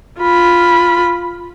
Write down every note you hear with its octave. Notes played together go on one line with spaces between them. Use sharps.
F4 B5